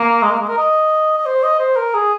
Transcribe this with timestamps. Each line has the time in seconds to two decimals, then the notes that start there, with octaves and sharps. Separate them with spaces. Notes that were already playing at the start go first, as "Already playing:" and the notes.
Already playing: A#3
0.22 G#3
0.31 A#3
0.39 G#3
0.48 A#4
0.58 D#5
1.18 D#5
1.26 C5
1.43 D#5
1.59 C5
1.76 A#4
1.94 G#4